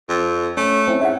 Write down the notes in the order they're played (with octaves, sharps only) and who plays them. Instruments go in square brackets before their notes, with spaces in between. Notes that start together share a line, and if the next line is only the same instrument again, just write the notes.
[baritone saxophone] F2
[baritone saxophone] A3 [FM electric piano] C#4
[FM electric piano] C4 C#4 E4
[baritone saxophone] G#2 [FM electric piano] E5 F#5